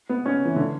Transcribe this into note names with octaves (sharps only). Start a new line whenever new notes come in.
B3
C#4
E3
D3